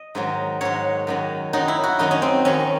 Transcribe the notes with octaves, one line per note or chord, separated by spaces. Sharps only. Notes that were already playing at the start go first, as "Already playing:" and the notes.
Already playing: D#5
G#2 D#3 F#3
G#2 D#3 F#3 C#5
F#2 D#3 F#3
F#2 D#3 F#3 D#4
E4
F#4
F#2 D#3 F#3 D#4
C#4
C4
F#2 D#3 F#3 C#4